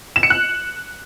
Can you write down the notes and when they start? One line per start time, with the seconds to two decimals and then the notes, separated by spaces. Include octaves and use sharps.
0.16 E7
0.23 C#7
0.30 F#6